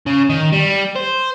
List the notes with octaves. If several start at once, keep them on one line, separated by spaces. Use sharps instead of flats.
C#3
D#3
G3
C5